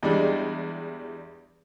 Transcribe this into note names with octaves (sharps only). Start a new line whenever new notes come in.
E2 G3 G#3 D4